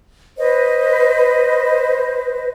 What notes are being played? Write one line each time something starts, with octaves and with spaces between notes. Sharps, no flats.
B4 C5 D#5